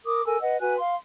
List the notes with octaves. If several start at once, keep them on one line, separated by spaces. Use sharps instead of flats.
A#4 D6 D#6
A4 A#4 G#5 E6
B4 D#5 F#5
F#4 B4 G#5 F#6
F5 C6